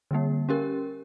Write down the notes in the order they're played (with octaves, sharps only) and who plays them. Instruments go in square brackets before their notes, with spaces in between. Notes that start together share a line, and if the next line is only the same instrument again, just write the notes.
[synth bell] D3 G3 A#3
C#4 G4 A#4